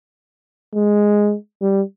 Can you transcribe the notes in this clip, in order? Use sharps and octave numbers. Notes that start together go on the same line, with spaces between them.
G#3
G3